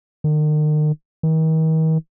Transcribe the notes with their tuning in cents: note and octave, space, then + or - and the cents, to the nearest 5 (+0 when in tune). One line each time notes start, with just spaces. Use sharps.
D#3 -40
D#3 +40